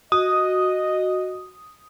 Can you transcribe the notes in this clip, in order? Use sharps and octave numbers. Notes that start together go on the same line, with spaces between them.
F#4 D#5 D#6